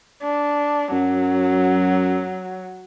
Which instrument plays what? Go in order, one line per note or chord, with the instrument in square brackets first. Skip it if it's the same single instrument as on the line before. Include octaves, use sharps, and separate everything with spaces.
[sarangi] D4
[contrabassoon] F#2 [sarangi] F#3